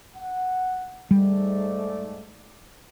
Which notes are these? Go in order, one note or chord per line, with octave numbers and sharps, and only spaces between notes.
F#5
G#2 G3 A3 D5